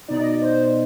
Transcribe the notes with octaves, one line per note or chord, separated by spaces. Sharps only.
B2 B3 D#4 D5
D#5
D5
C5
C5